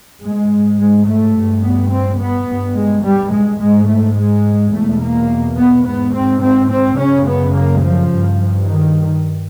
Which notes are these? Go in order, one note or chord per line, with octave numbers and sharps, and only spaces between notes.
G#2 G#3
G#3
A3
G2
B3
C4
B3
G2
G#3
G3
G#3
G#2 G#3
A3
G#3
E2 B2 A3
A#3
B3
G#2 B3
C4
C4
C4
F#2 C#3 C#4
B3
A#3
F3
G2
D#3